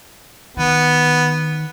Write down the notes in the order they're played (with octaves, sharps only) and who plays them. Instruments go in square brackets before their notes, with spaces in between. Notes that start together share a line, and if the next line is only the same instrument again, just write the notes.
[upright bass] D#3 [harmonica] B3